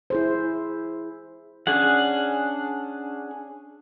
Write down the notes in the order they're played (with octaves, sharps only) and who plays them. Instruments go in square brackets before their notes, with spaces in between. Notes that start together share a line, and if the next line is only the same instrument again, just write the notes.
[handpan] E4 G#4 C5
[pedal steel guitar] C#4 D4 G#4 F#5